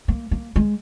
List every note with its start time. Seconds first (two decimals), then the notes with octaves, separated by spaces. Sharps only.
0.08 A#3
0.31 A#3
0.56 G#3